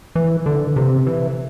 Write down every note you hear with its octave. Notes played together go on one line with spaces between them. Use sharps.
E3
D3
C3
E3